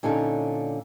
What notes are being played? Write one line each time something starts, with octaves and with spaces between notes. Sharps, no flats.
A#2 D3 C#4 D#4 A4